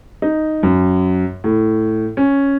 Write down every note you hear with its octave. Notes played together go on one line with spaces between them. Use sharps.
D#4
F#2
A2
C#4